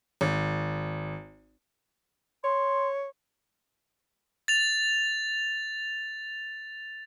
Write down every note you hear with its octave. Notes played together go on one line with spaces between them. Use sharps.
G#1
C#5 C6
A6 F7